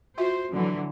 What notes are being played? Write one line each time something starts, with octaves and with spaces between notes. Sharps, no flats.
F4 F#4 C5 E5
D3 E3 F#3